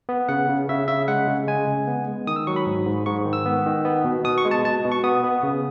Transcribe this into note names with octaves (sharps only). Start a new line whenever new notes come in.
B3
C#3 F#5
C#3
C#3 E5
C#3 E5
G#3 F#5
C#3
G#3 G#5
C#3
B3
G#3
D#3 D#6
E6
F#3 C#6
B5
G#2
G#2
G#2 C#6
D#3
E6
B3
D#3
B3
B2
B2 D#6
C#6
G#3
A5
B2 A5
B2
C#6
B3 D#6
B3
C#3